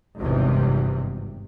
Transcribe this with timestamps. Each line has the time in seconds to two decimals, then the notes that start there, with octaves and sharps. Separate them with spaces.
0.19 G#1 E2 G2 C3